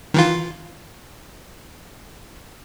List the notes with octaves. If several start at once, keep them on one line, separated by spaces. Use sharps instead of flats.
D#3 E3 F4